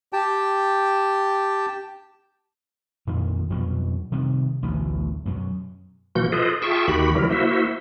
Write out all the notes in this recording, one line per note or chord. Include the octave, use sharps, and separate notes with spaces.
G4 G5 A5
F2 A#2 D#3
F2 B2 F#3 G3
C3 D#3 G3
A1 D2 B2 F#3
F#2 B2 F#3
B2 E3 F3 A#3 F#4 G6
F4 G#4 A4 B4 C5 D#5
F4 G#4 E5 G5 A5 C#6
D#2 D#3 F#4 G4 B5
C#3 E3 F#3 G3 E4 A#4
A#3 E4 F#4 C5 E5